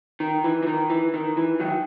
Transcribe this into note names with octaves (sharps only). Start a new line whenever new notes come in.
D#3
E3
E3
D#3
E3
D#3
E3
D#3 F#3